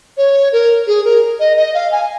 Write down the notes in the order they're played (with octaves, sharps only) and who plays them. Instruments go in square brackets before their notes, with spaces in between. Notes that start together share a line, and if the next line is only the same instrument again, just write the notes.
[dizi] C#5
A#4
G#4
A#4
D#5
D#5
F5
G#5